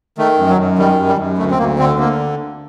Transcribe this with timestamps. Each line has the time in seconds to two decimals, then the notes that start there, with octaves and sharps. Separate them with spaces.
0.18 D#3 A3
0.38 F#2
0.48 F#3
0.58 F#2
0.79 D#3 G3
0.99 F#2
1.08 G3
1.19 F#2
1.38 D2 A3
1.51 C4
1.59 D2 A#3
1.79 D3 C4
1.99 D3 A#3